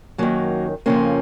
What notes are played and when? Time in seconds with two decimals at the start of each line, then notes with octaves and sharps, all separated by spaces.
0.18 F#2 D#3 F#3 A#3
0.86 F2 C#3 F3 A#3 C#4